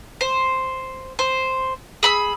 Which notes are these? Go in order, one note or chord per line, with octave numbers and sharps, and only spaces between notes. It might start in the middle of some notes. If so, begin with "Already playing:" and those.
C5
C5
G#4 B5 E6